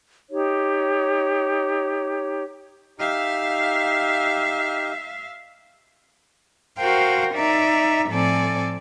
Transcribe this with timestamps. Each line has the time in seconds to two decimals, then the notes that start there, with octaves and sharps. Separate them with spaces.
0.30 D#4 G4 C#5
2.99 D#4 G4 E5 F5 F6
6.77 F#4 A#4 C5 F5 G5
7.35 D#4 D5 E5 A#5
8.09 A2 F3 C4 A4 D5 G#5